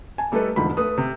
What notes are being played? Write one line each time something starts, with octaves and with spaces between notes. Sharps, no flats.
G#5 A5
G3 A3 D#4 A4 B4
E1 D2 G#2 F3 B5
A3 B4 D#6
C3